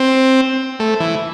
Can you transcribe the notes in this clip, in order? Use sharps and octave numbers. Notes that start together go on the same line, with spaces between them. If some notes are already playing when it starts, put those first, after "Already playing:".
Already playing: C4
A3
E3